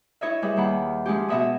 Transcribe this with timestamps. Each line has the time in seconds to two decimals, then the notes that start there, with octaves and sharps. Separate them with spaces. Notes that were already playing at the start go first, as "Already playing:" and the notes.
0.21 E4 C#5 D#5 E5
0.42 G3 G#4 B4 E5
0.57 D#2 D#3 F#5 B5
1.06 F3 G#3 C#4 G4
1.29 B2 B3 D#5 E5 F#5 D#6